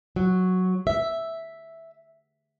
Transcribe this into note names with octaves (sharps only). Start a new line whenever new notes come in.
F#3
E5